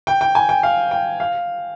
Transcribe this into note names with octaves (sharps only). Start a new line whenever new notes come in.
G5
G5
G#5
G5
F5
G5
F5